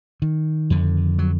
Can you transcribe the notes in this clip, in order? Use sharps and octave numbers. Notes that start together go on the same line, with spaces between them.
D#3
F2 D3
F#3